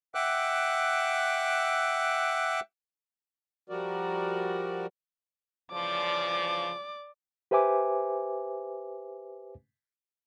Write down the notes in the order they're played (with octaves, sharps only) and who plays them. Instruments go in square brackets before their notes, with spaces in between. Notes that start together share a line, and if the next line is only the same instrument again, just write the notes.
[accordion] E5 F#5 G5 D6 E6 F#6
[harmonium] F3 G3 F#4 A#4 D5
[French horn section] C#3 E3 F3 [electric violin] D5 D6
[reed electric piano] G4 B4 C5 E5 G#5 D6